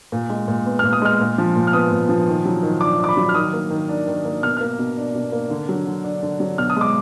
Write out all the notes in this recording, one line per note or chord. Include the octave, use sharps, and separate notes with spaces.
A#2
G#3
A#2
B3
A#2 F6
D#6
G#3 F6
A#2
F3
A#2
F6
B3 D#6
A#2
F3
D#3
F#3
D#3
D4 D6
D#3 D6
B5
F#3
F6
D#3 D#6
A#3
D#3
D4
D#3
A#3
B2 F6
A#3 F6
B2
D4
B2
A#3
D3
F#3
D3
D4
D3
F#3
B2 F6
D#6
G#3 D6